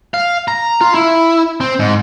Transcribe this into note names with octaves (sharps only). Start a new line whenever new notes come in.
F5
A#5
F4
E4
C4
G#2